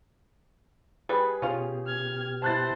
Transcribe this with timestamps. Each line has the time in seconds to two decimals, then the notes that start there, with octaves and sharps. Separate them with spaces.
1.09 G3 G#4 B4
1.42 B2 C#4 F4 G4
1.86 F6 G#6
2.42 E4 C5 A5 F#6 A6